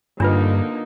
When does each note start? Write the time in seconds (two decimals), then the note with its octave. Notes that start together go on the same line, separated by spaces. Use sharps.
0.20 G2 D3 A#3 D4 D#4 F4 B4